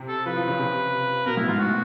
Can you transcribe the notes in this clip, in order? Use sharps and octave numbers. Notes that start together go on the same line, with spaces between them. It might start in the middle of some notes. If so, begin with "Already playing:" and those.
Already playing: C3
A4
F3 B4
F3
C#3
C3
B2 A#4
A2 E4
G#2 F4
F#4